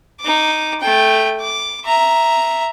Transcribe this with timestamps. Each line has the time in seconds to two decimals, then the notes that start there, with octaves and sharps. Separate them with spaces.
0.21 D#4 D6
0.80 A3 G5
1.41 D6
1.85 E5 A#5